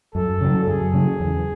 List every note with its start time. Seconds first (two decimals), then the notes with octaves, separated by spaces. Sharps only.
0.14 F#2 A4
0.41 C#3 F#3
0.67 F#2 G#4
0.94 C#3 F#3
1.20 E2